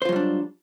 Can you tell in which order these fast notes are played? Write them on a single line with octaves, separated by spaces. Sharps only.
C5 F4 F#3 G3 D4